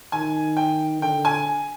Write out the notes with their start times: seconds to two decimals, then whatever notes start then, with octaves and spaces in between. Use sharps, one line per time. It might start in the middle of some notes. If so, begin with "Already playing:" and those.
0.12 D#3 G#5
0.57 G5
1.02 D3 G5
1.25 G#5